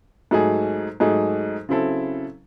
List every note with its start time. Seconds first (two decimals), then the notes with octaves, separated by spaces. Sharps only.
0.31 G#2 F#3 A3 D#4 G#4
1.00 G#2 F#3 A3 D#4 G#4
1.69 C#3 F#3 C4 E4 A4